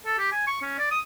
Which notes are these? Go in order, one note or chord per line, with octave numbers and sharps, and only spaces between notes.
A4
G4
G#5
C#6
C#4
D5
D#6